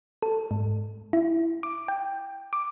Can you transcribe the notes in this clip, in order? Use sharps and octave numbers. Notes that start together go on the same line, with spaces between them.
A4
G#2
E4
D6
G5
D6